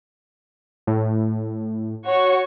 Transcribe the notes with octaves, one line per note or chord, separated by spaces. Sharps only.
A2
F#4 C#5 C#6